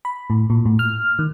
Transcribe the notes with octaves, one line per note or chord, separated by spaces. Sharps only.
B5
A2
A#2
A2
F6
D#3